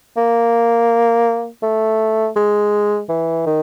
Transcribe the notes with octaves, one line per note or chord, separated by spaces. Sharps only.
A#3
A3
G#3
E3
D#3